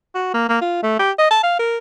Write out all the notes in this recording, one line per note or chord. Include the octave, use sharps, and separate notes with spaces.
F#4
A#3
A#3
F4
A3
G4
D#5
A5
F5
A#4